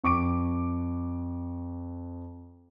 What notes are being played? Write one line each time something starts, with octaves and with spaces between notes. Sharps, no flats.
F2 C#6 D6 D7